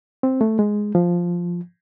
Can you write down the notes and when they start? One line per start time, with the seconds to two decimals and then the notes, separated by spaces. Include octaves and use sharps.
0.23 C4
0.41 A3
0.59 G#3
0.95 F3